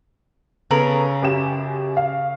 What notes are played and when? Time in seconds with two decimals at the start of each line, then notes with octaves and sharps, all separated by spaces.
0.71 C#3 B3 A4 A#4 A#5 B5
1.22 F#2 G4 E7
1.97 F5